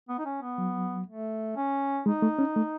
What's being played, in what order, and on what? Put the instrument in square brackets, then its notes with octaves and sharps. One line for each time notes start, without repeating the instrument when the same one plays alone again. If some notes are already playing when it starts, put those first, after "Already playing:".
[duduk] B3
D#4
C#4
B3
[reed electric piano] F#3
[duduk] A3
C#4
[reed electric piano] G#3 [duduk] D#4
[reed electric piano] A3
C#4
A3